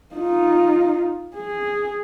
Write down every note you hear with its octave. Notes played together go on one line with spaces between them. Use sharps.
D#4 F4
G#4